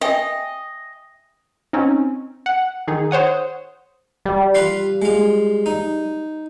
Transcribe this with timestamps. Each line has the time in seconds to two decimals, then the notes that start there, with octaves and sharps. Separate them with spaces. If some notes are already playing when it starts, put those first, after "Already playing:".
0.01 D#5 E5 G5 G#5
1.73 C4 C#4 D#4
2.46 F#5
2.88 D#3 D#4 G#4
3.11 C5 C#5 F#5 D#6
4.25 G3
4.55 F4 B4 C6
5.02 G#3 F4
5.66 D#4